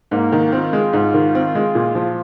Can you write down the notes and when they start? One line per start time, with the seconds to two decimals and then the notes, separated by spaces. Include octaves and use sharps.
0.11 G#2 A#3
0.32 D#3
0.52 C4 F4
0.73 G#3
0.93 G#2
1.14 D#3
1.35 C4
1.55 G#3
1.75 A#2
1.95 F3